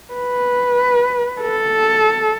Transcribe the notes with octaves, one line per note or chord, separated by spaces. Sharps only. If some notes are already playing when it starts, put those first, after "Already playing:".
B4
A4